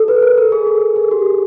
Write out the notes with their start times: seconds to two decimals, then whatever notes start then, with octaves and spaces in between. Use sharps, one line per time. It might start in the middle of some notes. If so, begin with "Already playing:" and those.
Already playing: A4
0.08 B4
0.23 A#4
0.38 A#4
0.52 G#4
0.67 A4
0.96 G#4
1.11 G4
1.26 G#4